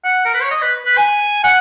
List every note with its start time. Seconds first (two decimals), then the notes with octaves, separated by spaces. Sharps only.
0.04 F#5
0.25 A#4
0.34 B4
0.42 C#5
0.51 D#5
0.62 B4
0.86 B4
0.97 G#5
1.44 F#5